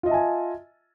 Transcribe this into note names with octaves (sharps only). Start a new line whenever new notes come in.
F4 D#5 E5 G#5 A5